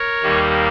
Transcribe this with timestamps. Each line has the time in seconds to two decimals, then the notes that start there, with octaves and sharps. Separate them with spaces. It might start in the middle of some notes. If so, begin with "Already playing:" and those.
Already playing: A#4 C#5
0.23 D#2 D#3 G3 A#3